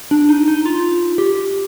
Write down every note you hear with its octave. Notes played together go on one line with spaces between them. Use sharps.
D4
D#4
D#4
F4
G4